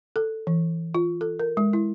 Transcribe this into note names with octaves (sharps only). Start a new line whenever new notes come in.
A4
E3
F4
A4
A#4
G#3
E4